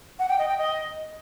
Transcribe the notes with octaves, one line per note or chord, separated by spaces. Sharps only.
F#5
G5
D#5
G5
D#5